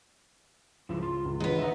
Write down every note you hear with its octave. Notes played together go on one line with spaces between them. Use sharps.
C#2 F3 E4
F4
C#2
D#2 D3 E3 G#3 B3
D#4 B4 D#5 E5 F#5